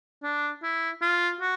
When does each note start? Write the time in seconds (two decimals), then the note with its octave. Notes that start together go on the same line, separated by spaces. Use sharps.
0.23 D4
0.63 E4
1.02 F4
1.41 F#4